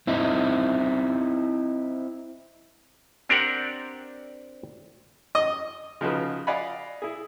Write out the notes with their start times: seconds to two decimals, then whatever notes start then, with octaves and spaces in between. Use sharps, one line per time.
0.07 C4 D#4 E4
3.29 C4 D4 G4 A#4 D5 F#5
5.35 D#5
6.01 C#3 F3 D#4 F#4 G#4 B4
6.47 D5 D#5 F5 F#5 G#5 B5
7.02 E4 G#4